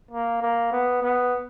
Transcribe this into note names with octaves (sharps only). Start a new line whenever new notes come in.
A#3
A#3
B3
B3